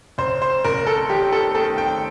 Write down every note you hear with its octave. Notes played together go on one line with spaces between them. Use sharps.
F#1 C5
C5
F#1 A#4
A4
D#3 G4
A4
D#3 A4
G5